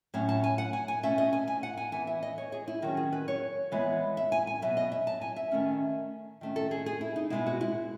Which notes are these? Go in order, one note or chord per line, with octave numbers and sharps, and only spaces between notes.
A2 F#3 C#4 C#5
A5
G#5
F#5
G#5
G#5
B2 A3 C#4 E5
D#5
G#5
G#5
F#5
G#5
E3 B3 G#5
E5
D#5
C#5
G#4
E4
D#3 F#3 C#4 F#4
G#4
B4
C#5
E3 G#3 B3
E5
G#5
G#5
B2 F#3 B3 E5
D#5
E5
A5
G#5
E5
D#3 A3 C#4
D#3 A3 C#4
A4
G#4
G#4
E4
D#4
B2 G#3 B3 E4
F#4
E4